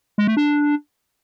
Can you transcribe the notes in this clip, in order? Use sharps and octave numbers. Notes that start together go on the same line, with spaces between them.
G#3
A3
D4